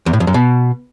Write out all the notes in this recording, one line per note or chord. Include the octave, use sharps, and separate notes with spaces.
E2
A2
F2
F#2
B2